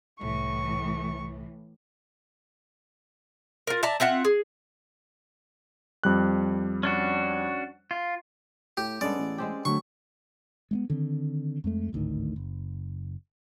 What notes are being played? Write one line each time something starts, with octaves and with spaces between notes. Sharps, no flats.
C2 A2 E3 C#6
F4 A#4
D5 E5 A5 A#5
C4 F4 E5 F#5
G#4
F2 G3 F#6
C#4 D4 F#4
F4
A2 G4
G2 G#3 B3 C#4 A4 D5
A1
G#3 C4 G4
D3 F#3 A3 C#6
G#3 A3 B3
D3 D#3 C4
F2 G#3 A3
G#1 D2 A2 D#3
F#1